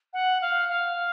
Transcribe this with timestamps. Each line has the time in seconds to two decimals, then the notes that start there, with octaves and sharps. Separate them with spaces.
0.13 F#5
0.41 F5
0.68 F5